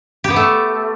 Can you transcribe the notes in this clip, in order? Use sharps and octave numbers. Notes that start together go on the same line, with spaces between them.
G4
B3
A3